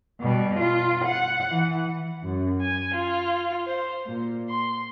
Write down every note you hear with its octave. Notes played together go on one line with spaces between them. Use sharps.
B2 G3
F4
F#5
E3
F#2
G#5
F4
C5
A#2
C6